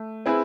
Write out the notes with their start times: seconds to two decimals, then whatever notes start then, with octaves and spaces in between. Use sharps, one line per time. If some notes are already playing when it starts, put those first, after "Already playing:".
Already playing: A3
0.26 C4 E4 G#4 B4